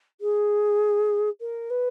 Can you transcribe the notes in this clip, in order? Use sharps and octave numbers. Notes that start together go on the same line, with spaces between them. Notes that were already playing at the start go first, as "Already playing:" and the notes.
G#4
A#4
B4